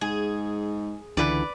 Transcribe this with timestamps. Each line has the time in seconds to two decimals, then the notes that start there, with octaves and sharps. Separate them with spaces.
0.01 G#2 G#4
1.17 C#2 D3 E3 B4 D5